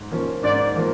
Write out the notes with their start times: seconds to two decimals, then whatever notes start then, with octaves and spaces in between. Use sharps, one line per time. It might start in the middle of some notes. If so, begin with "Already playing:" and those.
Already playing: G#2
0.12 F3 A#3 C#4
0.44 G#2 D5
0.76 F3 A#3